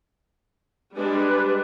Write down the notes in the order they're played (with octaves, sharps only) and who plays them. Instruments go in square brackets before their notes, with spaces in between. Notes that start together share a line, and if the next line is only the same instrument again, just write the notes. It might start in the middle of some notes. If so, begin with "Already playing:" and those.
[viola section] G3 G#3 D4 [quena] B4